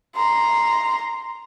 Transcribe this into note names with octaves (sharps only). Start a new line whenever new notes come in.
A#5 C6